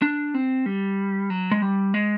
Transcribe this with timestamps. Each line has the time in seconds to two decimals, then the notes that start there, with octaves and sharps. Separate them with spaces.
0.02 D4
0.34 C4
0.66 G3
1.30 F#3
1.51 G#3
1.62 G3
1.94 G#3